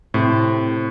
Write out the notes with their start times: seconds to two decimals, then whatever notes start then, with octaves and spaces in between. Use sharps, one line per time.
0.14 A2 C3